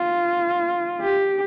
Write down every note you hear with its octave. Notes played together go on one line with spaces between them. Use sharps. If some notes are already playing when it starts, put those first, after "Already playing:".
Already playing: F4
G4